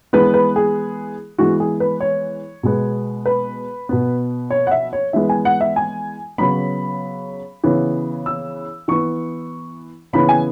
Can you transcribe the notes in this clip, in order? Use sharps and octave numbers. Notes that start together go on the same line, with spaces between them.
E3 G#3 B3 B4
B4
G#4
E3 G#3 B3 F#4
G#4
B4
C#5
B2 G#3 B3
B4
B2 B3
C#5
F#5
E5
C#5
E3 G#3 B3 E5
G#5
F#5
E5
G#5
C#3 F#3 B3 B5
C#3 E3 B3
E6
E3 B3 C#6
C#3 E3 B3 B5
G#5